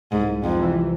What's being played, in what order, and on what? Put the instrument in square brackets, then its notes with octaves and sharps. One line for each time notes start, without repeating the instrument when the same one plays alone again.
[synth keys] C2 [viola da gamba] G#2
[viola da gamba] F2
[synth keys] C3 E3